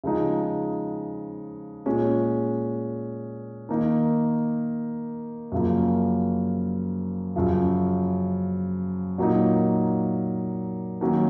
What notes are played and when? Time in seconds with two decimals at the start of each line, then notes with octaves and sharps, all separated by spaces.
0.04 C#3 F3 G#3 D#4
1.86 A#2 G#3 C#4
3.69 D#3 A#3 D#4
5.52 F#2 C#3 F3 A#3
7.36 F#2 C#3 F3
9.18 A#2 F#3 A#3 D#4
11.01 D#3 F#3 A#3 C#4